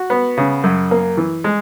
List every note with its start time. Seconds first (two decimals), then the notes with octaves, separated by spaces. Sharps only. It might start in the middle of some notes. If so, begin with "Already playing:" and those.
Already playing: F#4
0.10 B3
0.38 C#3
0.64 F#2
0.91 A#3
1.17 E3
1.44 G#3